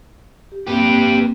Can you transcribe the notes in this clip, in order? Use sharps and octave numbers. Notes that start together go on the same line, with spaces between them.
G4
A#3 C4 G4 B4